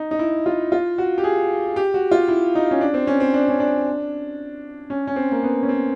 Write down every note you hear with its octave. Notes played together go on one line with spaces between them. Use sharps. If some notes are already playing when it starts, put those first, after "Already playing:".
Already playing: D#4
D#4
E4
F4
F4
F#4
G4
G#4
G4
F#4
F4
E4
D#4
C#4
D4
C4
C#4
C4
D4
C#4
D4
C#4
C#4
C4
A#3
B3
C#4
C4